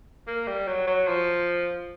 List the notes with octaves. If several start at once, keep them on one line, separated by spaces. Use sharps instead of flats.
A#3
G3
F#3
F#3
F3